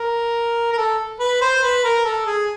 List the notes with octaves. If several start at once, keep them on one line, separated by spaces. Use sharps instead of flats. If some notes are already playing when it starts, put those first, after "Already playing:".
Already playing: A#4
A#4
A4
B4
C5
B4
A#4
A4
G#4